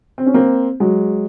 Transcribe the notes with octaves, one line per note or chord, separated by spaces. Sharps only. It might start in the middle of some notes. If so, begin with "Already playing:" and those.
C4
C#4
A#3 C4
F#3 G#3